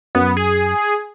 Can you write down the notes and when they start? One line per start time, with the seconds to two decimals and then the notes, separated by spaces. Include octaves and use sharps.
0.15 F#2 B3
0.37 G#4